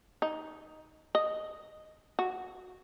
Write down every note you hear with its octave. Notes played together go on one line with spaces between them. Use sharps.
D#4
D#5
F#4